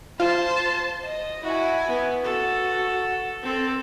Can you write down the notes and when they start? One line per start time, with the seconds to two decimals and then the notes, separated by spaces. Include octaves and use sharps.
0.20 F4 C5 A5
1.04 D#5
1.44 E4 F#4 G#5
1.88 B3
2.24 F#4 A4
3.43 C4 A4